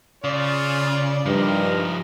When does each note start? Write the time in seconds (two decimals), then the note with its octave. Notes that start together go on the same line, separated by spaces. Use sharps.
0.24 C#3 F4 D5
1.26 G2 F3 D#4 A#4